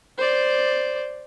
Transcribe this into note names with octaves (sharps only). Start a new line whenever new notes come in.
C5 D5